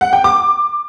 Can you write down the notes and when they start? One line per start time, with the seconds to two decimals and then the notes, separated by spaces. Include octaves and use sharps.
0.01 F#5
0.13 G5
0.24 D6